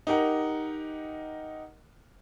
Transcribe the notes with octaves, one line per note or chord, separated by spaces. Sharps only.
D#4 G4 A#4 F#5